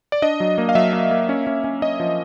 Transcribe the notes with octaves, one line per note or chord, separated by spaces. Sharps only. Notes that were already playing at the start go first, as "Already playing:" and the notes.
D5
D4 D#5
F#3
A#3
F5
F#3 E5
A#3
A#3
C#4
C#4
C#4
C#4 D#5
F3